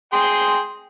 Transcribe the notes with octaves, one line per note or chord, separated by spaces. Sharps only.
G#4 G5 C6